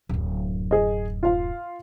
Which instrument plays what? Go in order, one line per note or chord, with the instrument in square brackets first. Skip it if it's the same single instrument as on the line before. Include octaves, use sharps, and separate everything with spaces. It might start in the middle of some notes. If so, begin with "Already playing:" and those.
[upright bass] D1 F#2
[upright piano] G#4 D#5
F4 F5